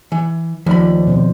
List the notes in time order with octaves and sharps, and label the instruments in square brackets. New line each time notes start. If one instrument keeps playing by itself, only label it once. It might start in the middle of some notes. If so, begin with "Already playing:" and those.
[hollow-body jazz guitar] E3
[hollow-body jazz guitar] D#2 B5 [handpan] F3 A3 D5
[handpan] B2 C4 C5